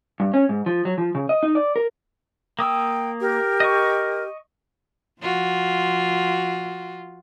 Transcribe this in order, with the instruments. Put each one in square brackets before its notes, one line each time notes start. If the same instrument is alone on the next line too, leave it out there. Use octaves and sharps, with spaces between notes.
[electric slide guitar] G2
C#4
G#2
F3
F#3
F3
C#3
D#5
D#4
D5
A#4
[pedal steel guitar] A#3 D#6 E6 [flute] G5
[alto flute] G4 [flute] A#4
[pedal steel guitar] D#5 C#6
[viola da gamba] F3 F4 F#4